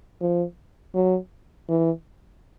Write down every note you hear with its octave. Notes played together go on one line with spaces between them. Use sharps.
F3
F#3
E3